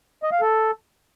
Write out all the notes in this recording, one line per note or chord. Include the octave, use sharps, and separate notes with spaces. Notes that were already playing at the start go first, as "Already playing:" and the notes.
D#5
F5
A4